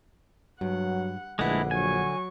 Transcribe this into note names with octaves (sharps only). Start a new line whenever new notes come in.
G2 F#3 F#5
A#1 D3 G#3 A3 E4 B4 F#5
F#3 G#5 C#6